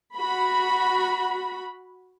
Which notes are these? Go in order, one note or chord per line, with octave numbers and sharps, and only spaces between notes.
F#4 B5